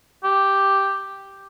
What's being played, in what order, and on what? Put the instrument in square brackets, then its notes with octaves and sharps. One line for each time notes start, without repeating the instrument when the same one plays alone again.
[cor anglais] G4